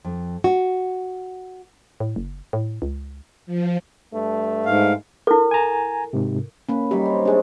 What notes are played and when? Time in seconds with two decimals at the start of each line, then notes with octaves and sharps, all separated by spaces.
0.05 F2
0.44 F#4
2.00 A2
2.16 F#1
2.53 A2
2.82 C#2
3.46 F3
4.13 G2 A3
4.66 G#2 F5
5.27 E4 A4 A#4
5.51 G#5 A#5
6.13 G#2 C3
6.69 A#3 C#4 B4
6.91 F#2 D#3 G3 G4 B5
7.06 C4 C#5
7.25 C3 G#3 A3 D4 G#4